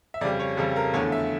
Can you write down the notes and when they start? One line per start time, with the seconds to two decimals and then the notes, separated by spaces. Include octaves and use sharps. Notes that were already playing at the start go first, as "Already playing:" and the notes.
0.14 E5
0.21 F2 C#3 G3 D5
0.39 C#5
0.57 F2 C#3 G3 A4
0.76 A#4
0.94 E2 D3 F3 A3 C#5
1.12 E5